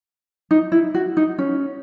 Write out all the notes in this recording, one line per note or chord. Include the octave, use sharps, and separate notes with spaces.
D#4
E4
F#4
D#4
C#4